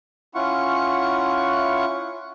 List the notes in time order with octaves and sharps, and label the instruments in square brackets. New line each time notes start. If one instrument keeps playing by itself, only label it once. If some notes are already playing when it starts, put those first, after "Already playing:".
[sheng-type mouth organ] C#4 E4 F4 F#5 C#6